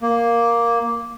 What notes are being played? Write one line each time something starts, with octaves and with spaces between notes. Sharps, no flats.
A#3